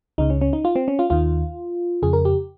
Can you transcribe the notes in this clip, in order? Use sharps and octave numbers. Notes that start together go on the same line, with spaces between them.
C#2 C#3 D#4
C#4
C#4
D#4
F4
C4
C#4
F4
D#2 D#3 F4
F2 C#3 G#4
A#4
G4